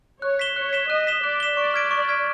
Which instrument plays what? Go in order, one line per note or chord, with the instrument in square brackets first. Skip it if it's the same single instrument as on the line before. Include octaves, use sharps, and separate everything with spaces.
[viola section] C#5 [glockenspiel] F#6
[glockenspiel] B6 E7 G7
[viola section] C#5 [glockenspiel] F#6
[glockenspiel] B6 E7 G7
[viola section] D#5 [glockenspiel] F#6
[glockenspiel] B6 E7 G7
[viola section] D5 [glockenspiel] F#6
[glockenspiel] B6 E7 G7
[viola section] D5 [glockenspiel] C#6
[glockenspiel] F6 G#6 B6 D7
C#6
F6 G#6 B6 D7